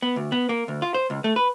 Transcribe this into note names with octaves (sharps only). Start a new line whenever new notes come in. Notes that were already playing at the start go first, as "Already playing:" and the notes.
B3
D2
B3
A#3
D2
F4
C5
C#2
A3
B4